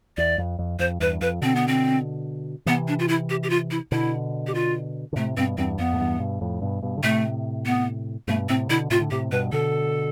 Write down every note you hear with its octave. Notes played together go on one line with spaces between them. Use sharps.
E2 D5
F2
F2
F2 C5
E2 G2 B4
F2 B4
B2 D3 C4
B3
C4
C3 E3 B3
D4
F4
E4
G4
G4
F4
E4
B2 D3 E4
G4
F4
D3
A2 C3 A3
G2 B2 C4
E2 G2 C4
F2 B3
A2
E2 G2
G2 B2
F2 A2
G2 B2
G2 B2
D3
A2 C3 A3
B3
G2 B2 A3
A2 C3 C4
B2 D3 E4
A2 C3 F4
D3
A2 C3 G4
G2 B2 B4
B2 D3 A4